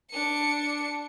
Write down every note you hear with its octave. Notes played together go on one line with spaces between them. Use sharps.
D4 C#7